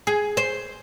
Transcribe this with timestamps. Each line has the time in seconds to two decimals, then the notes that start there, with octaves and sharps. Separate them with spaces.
0.07 G#4
0.37 C5